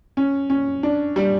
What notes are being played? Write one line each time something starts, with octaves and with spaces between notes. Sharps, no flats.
C#4
C#4
D4
G3